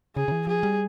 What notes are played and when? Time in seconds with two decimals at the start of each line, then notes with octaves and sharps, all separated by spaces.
0.16 C#3 G#4
0.28 C#3
0.32 E3
0.47 F3 G#4
0.63 G3